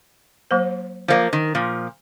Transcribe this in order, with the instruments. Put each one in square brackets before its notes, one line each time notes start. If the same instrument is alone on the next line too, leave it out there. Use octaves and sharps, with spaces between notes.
[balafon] F#3 A#3 C5
[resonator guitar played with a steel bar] F3 A#3 [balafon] C5 D5
[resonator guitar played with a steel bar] D#3
A#2 F3